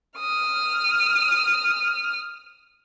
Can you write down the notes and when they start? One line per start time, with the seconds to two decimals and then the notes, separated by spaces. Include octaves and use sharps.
0.17 D#6 F6